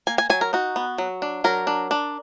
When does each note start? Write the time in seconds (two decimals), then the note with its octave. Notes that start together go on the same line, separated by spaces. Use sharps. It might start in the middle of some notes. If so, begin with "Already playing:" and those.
0.07 A#3 G#5
0.18 G#5
0.30 F#3 G#5
0.41 A#4
0.53 D#4 F#4
0.76 B3
0.98 F#3
1.22 D4
1.44 F#3 A#4
1.67 D4
1.91 D4